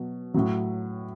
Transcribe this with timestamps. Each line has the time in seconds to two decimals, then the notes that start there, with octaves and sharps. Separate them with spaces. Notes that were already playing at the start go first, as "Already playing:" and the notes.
Already playing: B2 F#3
0.34 A2 F#3